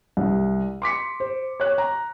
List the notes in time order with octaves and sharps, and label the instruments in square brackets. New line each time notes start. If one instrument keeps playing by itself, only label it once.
[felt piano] C2
C6 D6 B6 C#7
C5
C#5 F#6
A#5